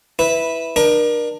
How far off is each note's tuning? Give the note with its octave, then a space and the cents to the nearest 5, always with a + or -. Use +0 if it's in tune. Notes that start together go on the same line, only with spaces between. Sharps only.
E4 -10 B4 +0
D4 +35 A#4 +30